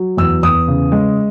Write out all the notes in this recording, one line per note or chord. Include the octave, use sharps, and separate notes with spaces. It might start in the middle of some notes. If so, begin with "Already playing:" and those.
Already playing: F#3
E2 E6
E2 D#6
C#3
G#3